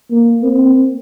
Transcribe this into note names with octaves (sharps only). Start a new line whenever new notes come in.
A#3
C4